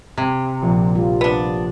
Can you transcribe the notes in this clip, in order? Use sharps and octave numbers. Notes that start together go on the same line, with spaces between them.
C3 G#6
A#1
F3 G3 F4
B3 D4